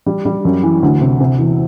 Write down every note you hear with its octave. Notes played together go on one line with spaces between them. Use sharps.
G3
G3
F#2
E3
D2
C3
C3
E2